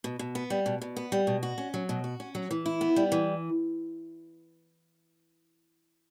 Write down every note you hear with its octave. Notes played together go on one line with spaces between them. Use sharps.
B2
B2
B3
G3
B2
B2
B3
G3
B2
F#4
C#4
F#3
B2
F#4
C#4
F#3
E3
E4
B3
G3
E3